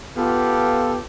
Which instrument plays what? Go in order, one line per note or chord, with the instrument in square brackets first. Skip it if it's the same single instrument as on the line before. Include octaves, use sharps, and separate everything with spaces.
[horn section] B3 F4 G4 [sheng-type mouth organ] A4